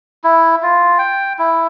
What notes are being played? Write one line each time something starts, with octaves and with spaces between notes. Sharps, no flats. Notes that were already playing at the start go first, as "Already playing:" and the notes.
E4
F4
G5
E4